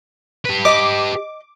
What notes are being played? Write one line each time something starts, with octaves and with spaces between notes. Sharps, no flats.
G4 B4
D#5 D6